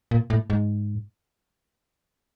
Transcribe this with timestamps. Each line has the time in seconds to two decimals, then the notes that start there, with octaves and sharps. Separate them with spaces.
0.11 A#2
0.30 A2
0.50 G#2